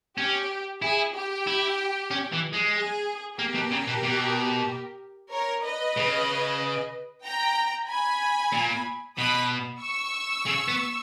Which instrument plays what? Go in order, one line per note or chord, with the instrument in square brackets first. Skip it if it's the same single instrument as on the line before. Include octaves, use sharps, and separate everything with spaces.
[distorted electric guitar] C#4 [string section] G4
[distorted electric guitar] E4 [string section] G#4
[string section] G4
[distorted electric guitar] E4
C#4
E3
G#3
[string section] G#4
[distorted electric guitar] A#3 [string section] G4 A#4
[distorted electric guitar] B2
C#3
B2
B2
[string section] A#4 C#5
B4 D#5
[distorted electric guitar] C#3
[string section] G5 A#5
G#5 B5
[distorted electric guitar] A#2
[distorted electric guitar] B2 [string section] B5 D#6
[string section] C#6 E6
[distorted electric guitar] C#3
B3